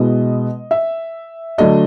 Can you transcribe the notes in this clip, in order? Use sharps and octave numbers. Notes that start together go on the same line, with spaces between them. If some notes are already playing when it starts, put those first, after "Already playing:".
Already playing: B2 G#3 B3 E4 D#5
E5
D3 F#3 A3 D4 D#5